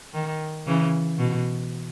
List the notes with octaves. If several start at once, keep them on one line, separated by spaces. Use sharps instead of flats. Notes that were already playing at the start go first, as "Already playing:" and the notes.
D#3
C#3 E3
B2